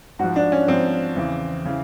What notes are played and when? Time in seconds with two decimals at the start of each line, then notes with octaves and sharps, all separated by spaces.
0.19 G#2 F3 F#4
0.36 D4
0.52 C#4
0.68 G#2 F3 C4
1.16 E2 C#3 E3
1.65 C#3 E3